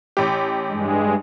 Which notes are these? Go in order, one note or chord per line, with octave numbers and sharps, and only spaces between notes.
A1 G4
G2 G#3